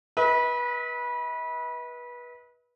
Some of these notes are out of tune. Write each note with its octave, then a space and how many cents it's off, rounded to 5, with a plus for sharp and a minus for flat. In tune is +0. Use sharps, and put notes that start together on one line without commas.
B4 -25 D#5 +45